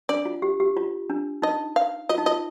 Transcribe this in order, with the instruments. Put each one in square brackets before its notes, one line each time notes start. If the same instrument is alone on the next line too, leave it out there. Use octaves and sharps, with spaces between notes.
[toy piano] D4 [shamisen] D5
[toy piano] F4
G4
G4
F4
D4
[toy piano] D#4 [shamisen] D#5
[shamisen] F5
[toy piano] F4 [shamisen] D#5
[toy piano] D#4
[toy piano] F4 [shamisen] D#5